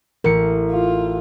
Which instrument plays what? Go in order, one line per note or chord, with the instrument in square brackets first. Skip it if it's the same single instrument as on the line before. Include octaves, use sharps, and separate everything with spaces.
[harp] A1 C#7 [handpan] A#4
[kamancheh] F4